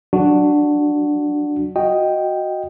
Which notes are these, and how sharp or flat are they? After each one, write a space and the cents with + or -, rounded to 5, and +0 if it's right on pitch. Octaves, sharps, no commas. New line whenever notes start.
F#3 +25 D4 +5 F#4 +0
F#4 -5 D#5 +0 G5 +0